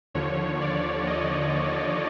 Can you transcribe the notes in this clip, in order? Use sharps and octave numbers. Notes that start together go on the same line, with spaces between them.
D#2 D3 F3 C#5
D5
D#5